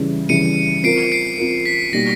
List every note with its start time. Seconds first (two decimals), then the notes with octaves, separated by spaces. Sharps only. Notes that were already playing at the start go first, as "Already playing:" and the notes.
Already playing: C#3 E3 G3
0.29 C#3 E3 G3 C#7 D#7
0.83 C4 F4 A#4 C7 D7
1.12 C7 D7
1.38 C4 F4 A#4
1.66 B6
1.92 B2 G3 A#3 D#4 G4 A#6